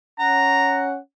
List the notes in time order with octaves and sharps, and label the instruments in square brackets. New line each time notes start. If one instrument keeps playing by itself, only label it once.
[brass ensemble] C#4 F#5 [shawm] A#5